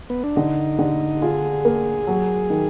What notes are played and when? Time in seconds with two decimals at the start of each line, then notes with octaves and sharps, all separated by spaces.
0.10 B3
0.24 D4
0.36 D3 D#4
0.79 D3
1.22 F4 G#4
1.65 A#3
2.07 F#3
2.50 D#3